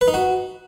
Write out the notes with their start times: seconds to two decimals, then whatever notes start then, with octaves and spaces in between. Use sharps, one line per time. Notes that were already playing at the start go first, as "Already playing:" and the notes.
0.01 B4
0.08 D#4
0.14 F#4